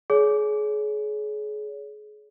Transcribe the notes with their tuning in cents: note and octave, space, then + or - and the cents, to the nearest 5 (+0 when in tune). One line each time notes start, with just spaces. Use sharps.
G#4 +30 C#5 +30